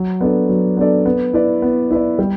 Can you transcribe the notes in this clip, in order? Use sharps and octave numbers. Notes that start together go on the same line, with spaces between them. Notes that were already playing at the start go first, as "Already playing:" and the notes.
Already playing: F#3
B3 D4 A4 D5
F#3
B3 D4 A4 D5
B3
E4 B4 D5
B3
E4 B4 D5
G3